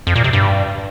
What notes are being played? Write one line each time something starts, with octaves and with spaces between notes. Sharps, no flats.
F2
A#2
C3
G2